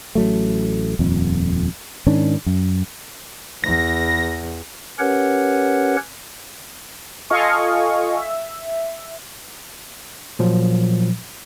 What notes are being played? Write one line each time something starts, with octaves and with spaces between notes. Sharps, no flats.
A1 F#3 A3
D#1 F2
G#2 D#3 C#4 D4
F#2
E2 A#6
C#4 G4 A#4 B4 C#5 F#5
F4 A4 D#5 F5 G#5 C#6
E5
A#2 F3 F#3